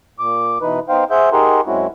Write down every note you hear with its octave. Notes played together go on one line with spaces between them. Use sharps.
A#2 D6
B2 E3 D#4 B4
B3 D#4 C5 F5 G5
G#4 C5 E5 F#5 G6
D#4 G4 G#4 A#4 F#5 C6
F#2 G#3 C4 C#4 E4 F#4